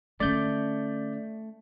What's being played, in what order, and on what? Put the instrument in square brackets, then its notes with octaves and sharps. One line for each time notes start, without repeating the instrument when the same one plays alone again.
[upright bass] D3 C#4 [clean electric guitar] A3 [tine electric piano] D5 G6